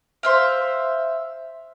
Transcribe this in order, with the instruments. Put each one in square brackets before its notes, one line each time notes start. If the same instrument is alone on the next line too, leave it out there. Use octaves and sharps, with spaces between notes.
[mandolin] C5 E5 F5